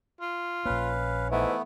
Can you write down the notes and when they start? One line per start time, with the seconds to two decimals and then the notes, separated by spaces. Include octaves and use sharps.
0.21 F4
0.65 A#1 A#3 C#4 B4 F5
1.31 G#2 E3 A3 B3